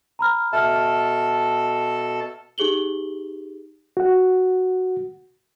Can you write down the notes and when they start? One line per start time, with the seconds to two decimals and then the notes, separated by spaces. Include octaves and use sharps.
0.19 A#5 B5 F6
0.53 B2 A4 E5 A5 F6
2.58 D#4 G4 G#4 F#7 G7
3.97 F#4 F#5